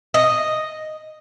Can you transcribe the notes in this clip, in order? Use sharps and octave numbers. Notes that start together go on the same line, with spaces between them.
D#5